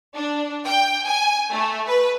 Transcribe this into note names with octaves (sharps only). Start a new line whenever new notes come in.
D4
G5
G#5
A3
B4